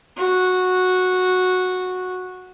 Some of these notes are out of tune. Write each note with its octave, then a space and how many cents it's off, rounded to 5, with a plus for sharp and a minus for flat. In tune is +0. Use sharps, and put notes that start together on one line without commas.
F#4 -10